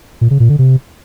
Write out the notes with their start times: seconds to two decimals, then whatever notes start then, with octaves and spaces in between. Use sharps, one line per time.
0.21 A#2
0.31 C#3
0.40 A#2
0.49 D3
0.59 C3